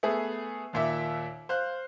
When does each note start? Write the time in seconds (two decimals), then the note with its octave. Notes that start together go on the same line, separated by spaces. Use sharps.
0.03 A3 B3 G#4
0.73 D#2 A#2 E5
1.49 C5 F5 F#6